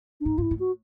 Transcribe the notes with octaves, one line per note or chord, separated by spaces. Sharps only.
D4
G#2 D#4
G#2 F4
E4
A2
F#4